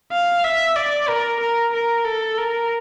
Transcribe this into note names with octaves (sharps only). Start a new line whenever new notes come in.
F5
E5
D5
A#4
A#4
A#4
A4
A#4